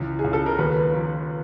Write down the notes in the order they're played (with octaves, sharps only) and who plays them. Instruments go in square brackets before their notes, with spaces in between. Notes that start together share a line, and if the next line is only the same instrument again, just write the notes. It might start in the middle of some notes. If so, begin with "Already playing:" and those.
Already playing: [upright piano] C#2 E3
G#4
C#2
A4
A#4
D#2 B4
F3